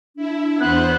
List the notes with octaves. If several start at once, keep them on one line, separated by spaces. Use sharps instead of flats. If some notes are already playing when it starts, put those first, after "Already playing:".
D4 E4
E2 B3 C5 F#6